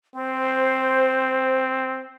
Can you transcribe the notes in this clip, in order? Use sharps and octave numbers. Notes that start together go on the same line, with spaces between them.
C4 C5